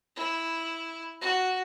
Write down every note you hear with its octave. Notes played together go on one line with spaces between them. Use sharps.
E4
F#4